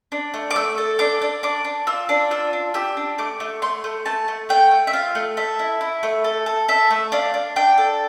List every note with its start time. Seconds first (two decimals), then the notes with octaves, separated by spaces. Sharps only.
0.12 D4
0.34 A3
0.51 D6
0.56 A3 E6
0.78 A4
0.99 D4 D6
1.22 D4
1.43 D4 D6
1.65 D4
1.87 F4 E6
2.09 D4
2.31 F4 E6
2.53 D4
2.74 G4 E6
2.97 D4
3.18 A3 D6
3.40 A3
3.62 A3 C6
3.84 A3
4.06 A3 A5
4.28 A3
4.49 A3 G5
4.71 A3
4.87 E5
4.93 F4 F5
5.15 A3
5.37 A4 E5
5.59 E4
5.81 E4
6.03 A3
6.24 A4
6.46 A4
6.68 A4 E5
6.90 A3
7.12 D4 F5
7.34 D4
7.56 D4 G5
7.78 A4